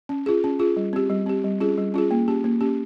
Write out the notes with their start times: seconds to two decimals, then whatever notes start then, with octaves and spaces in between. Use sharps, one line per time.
0.09 C#4
0.26 F4 G#4
0.44 C#4
0.59 F4 G#4
0.76 G3
0.93 C4 G4
1.10 G3
1.26 C4 G4
1.44 G3
1.60 C#4 F4 G#4
1.78 G3
1.94 C#4 F4 G#4
2.11 A#3
2.28 C#4 G4
2.44 A#3
2.61 C#4 G4